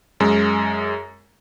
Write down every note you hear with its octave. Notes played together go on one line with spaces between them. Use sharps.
F#2 G#3